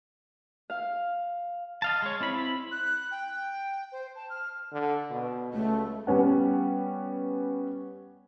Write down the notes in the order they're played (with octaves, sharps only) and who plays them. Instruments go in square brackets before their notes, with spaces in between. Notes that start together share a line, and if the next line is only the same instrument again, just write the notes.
[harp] F5
[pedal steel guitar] D#5 F5 A5
G#3 C#5
C4 E4 B5
[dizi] F#6
G5
C5
A5
F6
[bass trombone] D3
B2
[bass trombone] C#2 [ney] A3
[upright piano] G3 B3 C#4 F#5